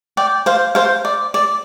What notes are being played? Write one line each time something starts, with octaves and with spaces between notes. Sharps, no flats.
D5 G5
C5 F5
C5 F5
D5
D5